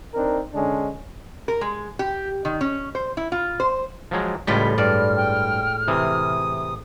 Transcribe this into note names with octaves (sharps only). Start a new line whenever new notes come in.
C4 D4 D#4 A#4
D3 G#3 C#4 D4
A#4
G#3
G4
D#3
C#4
C5
E4
F4
C5
F3 F#3 G#3
C#2 A2 G3 G#3 F4 B6
G2 D5 F6
G5
C3 E3 D#6